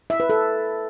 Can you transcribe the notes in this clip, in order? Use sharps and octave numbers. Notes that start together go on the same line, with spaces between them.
E5
B4
A4